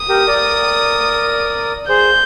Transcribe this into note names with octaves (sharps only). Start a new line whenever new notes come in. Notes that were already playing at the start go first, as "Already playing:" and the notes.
Already playing: D#6
G4 A#4
A#4 D5
G#4 C5 G6